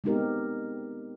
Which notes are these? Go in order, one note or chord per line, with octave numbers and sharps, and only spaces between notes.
G#3 B3 C4 D#4 G4 A#4